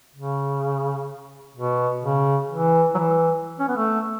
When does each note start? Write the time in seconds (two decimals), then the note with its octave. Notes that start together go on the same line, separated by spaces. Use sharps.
0.16 C#3
1.57 B2
2.04 C#3
2.51 E3
2.95 F#3
2.98 E3
3.60 C#4
3.68 B3
3.77 A3